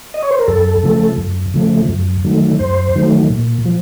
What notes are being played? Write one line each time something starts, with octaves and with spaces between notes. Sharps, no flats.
D#5
C#5
C5
A#4
F#2 A4
C#3 F3 A3
F#2
C#3 F3 A3
F#2
D#3 F#3 A3
F#2 C5
D#3 F#3 A3
A#2
F3